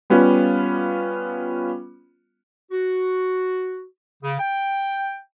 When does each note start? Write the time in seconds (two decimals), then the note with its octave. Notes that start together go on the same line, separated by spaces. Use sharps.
0.10 G3 B3 C#4 F4
2.72 F#4
4.23 C#3
4.39 G5